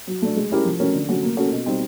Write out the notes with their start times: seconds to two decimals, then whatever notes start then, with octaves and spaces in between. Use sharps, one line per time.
0.07 F#3
0.22 A3 D4
0.37 G#3
0.51 C#4 E4 G4 A#4
0.65 F3
0.80 A3 C#4 F#4 A#4
0.94 D3
1.08 F#3 A3 C#4 F#4
1.23 A#3
1.37 C#4 F#4 A4
1.51 B2
1.66 G3 C4 D#4